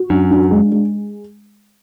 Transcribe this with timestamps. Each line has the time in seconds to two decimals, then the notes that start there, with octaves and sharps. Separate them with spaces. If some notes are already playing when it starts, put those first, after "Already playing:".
Already playing: F#4
0.10 F#2 D4
0.31 D4
0.51 G#3
0.72 G#3